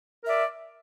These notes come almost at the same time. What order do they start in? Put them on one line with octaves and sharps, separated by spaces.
A#4 E5 D5